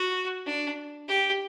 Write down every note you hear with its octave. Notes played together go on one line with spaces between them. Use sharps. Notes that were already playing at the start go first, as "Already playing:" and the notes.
Already playing: F#4
D4
G4